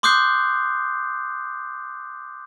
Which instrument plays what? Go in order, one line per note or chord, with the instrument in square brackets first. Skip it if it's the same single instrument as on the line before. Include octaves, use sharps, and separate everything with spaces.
[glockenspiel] C6 D6 D#6 F#6 G6 C7